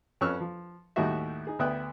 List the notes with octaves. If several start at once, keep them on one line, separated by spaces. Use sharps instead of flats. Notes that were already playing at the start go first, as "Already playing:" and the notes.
F2 C#4 B4 C#6 E6 F6
F3
D#2 A2 G3 D#4 F#4 E5
D#4 G#4
D2 B3 E5 G5 D#6 F#6